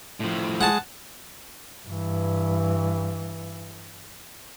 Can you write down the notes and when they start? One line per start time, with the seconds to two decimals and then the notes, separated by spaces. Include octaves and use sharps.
0.20 A2 F3
0.61 G#3 F#5 A5
1.86 G2 E3